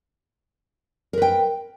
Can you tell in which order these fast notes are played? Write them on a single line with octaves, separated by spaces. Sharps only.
A#4 B4 G5